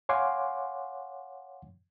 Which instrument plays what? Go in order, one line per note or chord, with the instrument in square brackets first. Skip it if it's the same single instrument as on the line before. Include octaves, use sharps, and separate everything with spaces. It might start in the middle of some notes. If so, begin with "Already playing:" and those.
[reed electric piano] C#5 F5 F#5 G#5 C6 D6